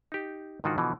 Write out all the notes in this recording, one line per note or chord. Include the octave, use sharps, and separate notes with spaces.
D#4 G4
G#2 D3 D#3 F4 F#4
B2 D3 E3 F3